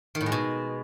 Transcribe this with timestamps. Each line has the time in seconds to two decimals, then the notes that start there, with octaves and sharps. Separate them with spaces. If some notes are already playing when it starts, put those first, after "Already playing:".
0.15 D#3
0.21 A2
0.26 G#3
0.32 B2